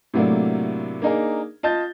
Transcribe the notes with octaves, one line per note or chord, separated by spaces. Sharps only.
A2 C3 F#3 A3 A#3 D4
A#3 D4 D#4 G#4 A#4
F4 D#5 A5 G6 A6